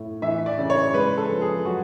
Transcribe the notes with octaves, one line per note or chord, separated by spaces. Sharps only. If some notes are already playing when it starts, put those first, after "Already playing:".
Already playing: A2
E3 E5
D5
C#3
C#5
G#3 B4
A4
F3
G#4
F#3 F#4